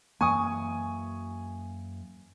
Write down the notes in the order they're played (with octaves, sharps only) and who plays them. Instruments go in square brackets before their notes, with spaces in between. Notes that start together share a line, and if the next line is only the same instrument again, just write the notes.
[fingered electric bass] F#2 E3 A#3 [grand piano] G#5 C#6 D#6